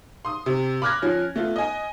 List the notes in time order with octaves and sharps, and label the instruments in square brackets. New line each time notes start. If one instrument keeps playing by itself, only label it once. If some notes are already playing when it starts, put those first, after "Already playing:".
[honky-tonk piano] C6 D#6
C3
B5 D6 F6 F#6 G#6 A#6
F3 C#4
A3 B3 F4
D#5 G#5